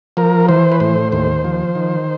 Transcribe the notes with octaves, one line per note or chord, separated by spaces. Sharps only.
F3 A#4
E3 C5
B4
A2 C5
D#2 C5
F3
D#3